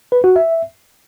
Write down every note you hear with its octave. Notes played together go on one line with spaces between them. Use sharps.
B4
F#4
E5